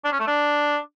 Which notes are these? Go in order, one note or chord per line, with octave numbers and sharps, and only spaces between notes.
D4
C#4
A3
D4